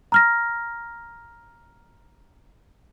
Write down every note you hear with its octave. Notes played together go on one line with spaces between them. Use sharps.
A#5 F6 A#6